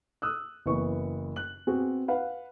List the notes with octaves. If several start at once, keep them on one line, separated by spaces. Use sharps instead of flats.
D#6 E6 F#6
F#1 E3 B3 C#6
F#6 F#7
B3 C4 F#4 G#4
B4 F5 F#5